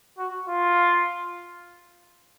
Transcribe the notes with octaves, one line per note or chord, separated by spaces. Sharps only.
F#4
F4